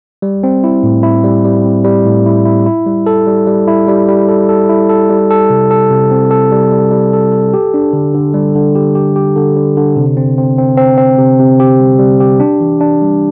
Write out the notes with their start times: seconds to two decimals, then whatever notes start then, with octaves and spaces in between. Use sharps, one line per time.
0.22 G3
0.43 C4
0.64 E4
0.83 A2
1.03 E4
1.23 G3
1.45 G3
1.65 C4
1.84 G3
2.05 A2
2.26 E4
2.45 E4
2.66 E4
2.86 G3
3.06 A4
3.27 G3
3.47 G3
3.67 E4
3.88 G3
4.08 G3
4.29 A4
4.49 A4
4.69 E4
4.89 A4
5.10 G3
5.31 A4
5.50 C3
5.71 A4
5.91 C3
6.11 C4
6.31 A4
6.52 G3
6.72 G3
6.92 G3
7.13 A4
7.32 A4
7.54 G4
7.74 D4
7.93 D3
8.14 D3
8.34 G3
8.55 D3
8.75 G4
8.95 G4
9.16 G4
9.36 D3
9.57 D3
9.77 D3
9.96 C3
10.17 C4
10.38 C4
10.58 C4
10.77 C4
10.98 C4
11.18 C3
11.39 C3
11.60 G4
11.79 G3
11.99 G3
12.20 G4
12.40 D4
12.61 E3
12.80 D4
13.02 G3